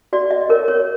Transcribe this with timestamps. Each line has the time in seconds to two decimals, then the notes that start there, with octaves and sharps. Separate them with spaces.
0.13 F#4 D5
0.31 D#5
0.49 A#4 C#5
0.68 C#5